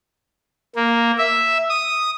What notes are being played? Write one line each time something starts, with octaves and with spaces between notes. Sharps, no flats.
A#3
E5
D#6